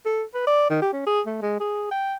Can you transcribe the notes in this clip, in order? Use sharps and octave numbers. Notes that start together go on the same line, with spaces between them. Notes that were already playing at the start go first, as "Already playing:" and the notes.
A4
B4
D5
D#3
G4
C#4
G#4
A3
G#3
G#4
G5